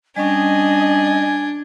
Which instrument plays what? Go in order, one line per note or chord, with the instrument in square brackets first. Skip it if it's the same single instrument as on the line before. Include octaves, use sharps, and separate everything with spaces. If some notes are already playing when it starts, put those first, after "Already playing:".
[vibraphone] G3 C#4 [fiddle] D4 [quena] D#5 [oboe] G#5